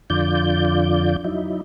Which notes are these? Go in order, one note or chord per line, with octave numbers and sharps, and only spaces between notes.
F2 D3 F4 D5 G6
F#3 D#4 E4